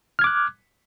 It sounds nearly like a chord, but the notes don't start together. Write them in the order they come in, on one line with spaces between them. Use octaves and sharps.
F6 G#6 D6 F#6